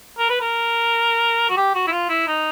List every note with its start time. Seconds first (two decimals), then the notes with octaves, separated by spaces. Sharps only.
0.18 A#4
0.29 B4
0.41 A#4
1.49 F#4
1.57 G4
1.75 F#4
1.87 E4
1.91 F4
2.09 E4
2.27 D#4